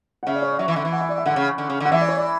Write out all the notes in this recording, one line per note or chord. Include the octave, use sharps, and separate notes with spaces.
F#5
C#3 E5
D5
C#5
D5
F#3 E5
E3
D3 E5
E3
F#5
E5
D5
E5
D3 F#5
C#3
D3
C#3
D3 F#5
E3 E5
D5
C#5
D5